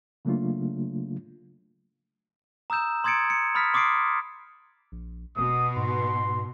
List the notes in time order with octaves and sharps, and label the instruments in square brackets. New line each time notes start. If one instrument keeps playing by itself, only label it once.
[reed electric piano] C#3 F#3 A3 A#3 D4 F4
[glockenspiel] A#5 D#6 E6 G6 E7
C6 D#6 G#6 A6 C#7 D7
C#7
B5 D#6 F6 A6 B6
C6 D6 D#6 A6 C7 D7
[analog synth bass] A#1
[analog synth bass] E1 [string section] B2 [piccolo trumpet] D#6
[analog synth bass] G#2 [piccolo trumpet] C6